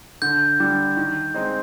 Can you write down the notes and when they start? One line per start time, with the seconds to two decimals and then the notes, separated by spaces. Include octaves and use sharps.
0.22 D3 G6
0.60 G3 D4
0.97 D#3
1.34 G#3 C4 D#4